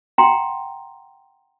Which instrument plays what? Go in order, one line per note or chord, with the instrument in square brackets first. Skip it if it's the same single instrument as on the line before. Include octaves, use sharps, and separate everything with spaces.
[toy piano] F#5 G5 A#5 C6